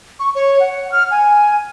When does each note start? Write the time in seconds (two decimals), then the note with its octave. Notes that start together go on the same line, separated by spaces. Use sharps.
0.20 C#6
0.35 C#5
0.60 F#5
0.92 F6
1.11 G#5